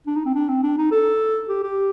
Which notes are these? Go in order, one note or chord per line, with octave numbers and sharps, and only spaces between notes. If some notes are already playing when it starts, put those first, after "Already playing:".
D4
D#4
C4
D4
C4
D4
D#4
A4
G4
G4